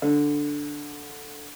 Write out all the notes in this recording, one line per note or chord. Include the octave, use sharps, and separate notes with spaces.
D3